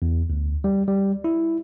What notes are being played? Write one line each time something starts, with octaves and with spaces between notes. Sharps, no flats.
E2
D2
G3
G3
E4